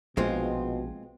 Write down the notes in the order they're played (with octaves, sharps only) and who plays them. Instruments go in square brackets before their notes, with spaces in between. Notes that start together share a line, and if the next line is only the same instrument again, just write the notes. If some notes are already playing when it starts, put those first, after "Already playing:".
[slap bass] A#1 [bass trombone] B2 [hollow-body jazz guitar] G#3 C4 F4